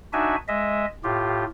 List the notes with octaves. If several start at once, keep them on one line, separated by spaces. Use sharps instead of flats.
D4 D#4 F#4 E5 G#5
G#3 D#5 E5
A2 F4 G4